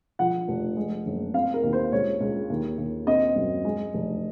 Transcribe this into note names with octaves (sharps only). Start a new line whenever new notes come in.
F3 F#5
F1
G#3
F#1
C4 F5
A#4
D#2
C5
C#2 C#5
C#2
D#2
D#2
C4 D#5
F#2
G#3
F1